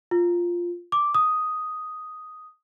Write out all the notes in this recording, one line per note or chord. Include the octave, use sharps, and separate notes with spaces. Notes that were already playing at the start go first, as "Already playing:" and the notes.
F4
D6
D#6